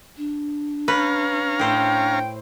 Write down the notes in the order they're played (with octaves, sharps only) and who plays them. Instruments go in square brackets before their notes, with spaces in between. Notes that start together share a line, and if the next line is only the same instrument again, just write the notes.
[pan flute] D4
[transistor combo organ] C#4 F5 A#5 [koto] B4
[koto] A2 C5 [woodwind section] G5